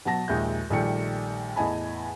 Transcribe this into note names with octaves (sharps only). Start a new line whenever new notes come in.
B2 F#3 A5 A#6
A#1 D#2 G#3 E5 G6
A#1 D#3 G3 A3 G5 C#7
E2 A2 D#5 G#5 A5 B5